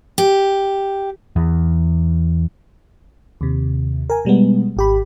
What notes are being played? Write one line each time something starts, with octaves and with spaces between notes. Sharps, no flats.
G4
E2
D#2 C3
A#4 G#5
B2 G3 G#3 B3
G#1 G4 B5